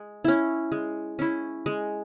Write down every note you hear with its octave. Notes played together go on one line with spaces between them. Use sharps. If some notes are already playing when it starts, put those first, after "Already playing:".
Already playing: G#3
C#4 E4
G#3
C#4 E4
G#3